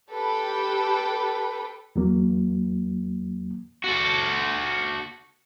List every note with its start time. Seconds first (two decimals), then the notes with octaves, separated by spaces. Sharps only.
0.10 G4 A4 B4 G5
1.96 E2 F#3 A#3
3.84 F#4 A4